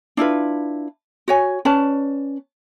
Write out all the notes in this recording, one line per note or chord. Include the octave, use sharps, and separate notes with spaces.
D4 E4 F4 B4
F#4 C#5 G#5
C#4 B4 D5 A5